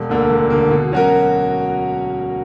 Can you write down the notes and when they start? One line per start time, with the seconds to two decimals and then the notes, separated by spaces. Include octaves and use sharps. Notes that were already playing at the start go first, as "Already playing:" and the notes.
Already playing: E1
0.09 D2 D3 A#3
0.30 E1
0.50 D2 D3 A#3
0.71 B2
0.92 F#3 C#4 F#4 A#4